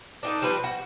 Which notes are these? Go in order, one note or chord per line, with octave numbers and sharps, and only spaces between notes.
D4 D#4 A4
F3 G3 C4 B4
F#4